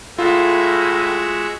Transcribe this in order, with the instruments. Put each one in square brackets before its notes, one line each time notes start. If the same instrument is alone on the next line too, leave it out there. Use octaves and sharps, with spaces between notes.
[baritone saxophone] A2 [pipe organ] G#3 F#4 E5 [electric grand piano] F4